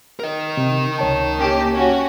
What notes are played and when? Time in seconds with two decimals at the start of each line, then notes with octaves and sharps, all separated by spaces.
0.20 A#4 D#5
0.57 C3
0.98 C#2 C#5 A5
1.37 A#3 C#4 G4
1.71 C#4 F#4